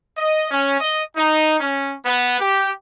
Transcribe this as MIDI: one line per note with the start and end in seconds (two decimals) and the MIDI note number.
0.18 0.49 75
0.51 0.80 61
0.80 1.02 75
1.17 1.57 63
1.60 1.95 61
2.06 2.37 59
2.40 2.71 67